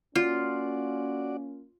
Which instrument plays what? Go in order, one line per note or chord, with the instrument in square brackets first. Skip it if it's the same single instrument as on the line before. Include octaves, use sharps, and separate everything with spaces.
[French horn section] A#3 C#4 [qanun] F4 [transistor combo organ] F#4 D5